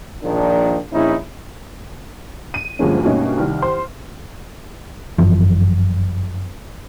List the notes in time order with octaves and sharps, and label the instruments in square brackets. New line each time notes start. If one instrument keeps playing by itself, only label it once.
[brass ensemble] A#1 A#2 D#3 F3 D4
A#1 C#4 D#4 E4
[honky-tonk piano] D#7
D2 G2 F3 G#3 A#3 C#4
G2 B2 A3 A#3 C#4 D#4
C2 D#3 F6
C5 C6
[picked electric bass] G1 F#2 E3 F3